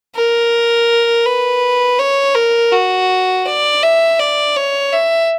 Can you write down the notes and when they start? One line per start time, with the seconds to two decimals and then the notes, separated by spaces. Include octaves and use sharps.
0.15 A#4
1.26 B4
1.99 C#5
2.35 A#4
2.73 F#4
3.46 D5
3.83 E5
4.20 D5
4.56 C#5
4.93 E5